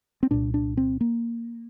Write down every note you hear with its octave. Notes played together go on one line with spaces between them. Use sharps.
C4
C2 A#2 D4
D4
C4
A#3